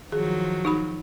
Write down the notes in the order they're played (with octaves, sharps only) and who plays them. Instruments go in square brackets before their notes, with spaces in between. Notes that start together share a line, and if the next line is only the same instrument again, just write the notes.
[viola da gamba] D#3 F3 F#3 [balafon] G#4
[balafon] D#4 F#4 B5